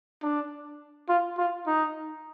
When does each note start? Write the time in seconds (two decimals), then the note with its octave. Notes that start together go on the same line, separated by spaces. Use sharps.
0.23 D4
1.09 F4
1.38 F4
1.67 D#4